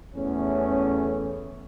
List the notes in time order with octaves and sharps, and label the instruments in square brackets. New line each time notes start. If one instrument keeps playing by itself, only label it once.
[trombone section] E2 A3 C#4